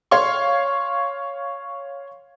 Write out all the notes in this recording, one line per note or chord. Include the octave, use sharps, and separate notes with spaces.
C#5 F5 C6 C#6